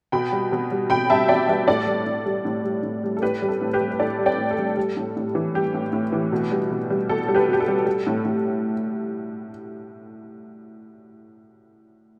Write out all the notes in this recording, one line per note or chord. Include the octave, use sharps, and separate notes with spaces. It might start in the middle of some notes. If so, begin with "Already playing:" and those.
B2 G5 B5
G3
B2
G3
B2 G5 B5
G3 E5 A5
B2 D5 G5
G3 B4 E5
A2 A4 D5
G3
A2
G3
A2
G3
A2
G3
A4
A2 G4 B4
G3
A4
A2
G4 B4
G3
B4
A2 A4 D5
G3
D5 G5
A2
A4
G3
G3
A2
A2
E3
G3 G4
A2
A2
E3
B2
G3
B2
G3
B2 A4
G3
G4 B4
B2 G4
A4
G3
G3
A2
A2